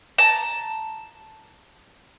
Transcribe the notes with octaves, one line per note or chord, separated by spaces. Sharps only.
A5 A#5